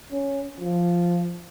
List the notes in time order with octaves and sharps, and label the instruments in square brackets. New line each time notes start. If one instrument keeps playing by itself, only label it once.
[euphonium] C#4
F3